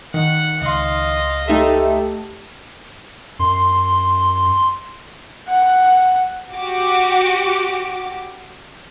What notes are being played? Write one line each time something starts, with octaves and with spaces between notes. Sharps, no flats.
D#3 F#5
C#2 D#5 F5 C6
A3 D#4 G4 A4 E5
F#2 C6
F#5
F#4 G4 D6